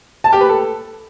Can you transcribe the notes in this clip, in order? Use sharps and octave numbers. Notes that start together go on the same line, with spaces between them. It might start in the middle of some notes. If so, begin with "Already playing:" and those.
A5
G4
B4
A4